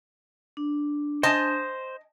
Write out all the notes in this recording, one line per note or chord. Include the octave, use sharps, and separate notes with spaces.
D4
C5 D#5 G#5 A5